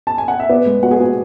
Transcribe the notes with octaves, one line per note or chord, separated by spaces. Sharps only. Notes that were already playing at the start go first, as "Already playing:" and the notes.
A5
G#5
F#5
E5
B3 D5
G#3
B3 F#4 F#5
G#4 G#5
B3 F#4 F#5